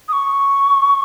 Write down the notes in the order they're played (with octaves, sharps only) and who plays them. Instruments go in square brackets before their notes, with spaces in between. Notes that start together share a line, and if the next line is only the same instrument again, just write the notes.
[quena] D#6
C#6